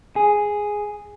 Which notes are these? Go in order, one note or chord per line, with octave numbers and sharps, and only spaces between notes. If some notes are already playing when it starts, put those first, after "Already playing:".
G#4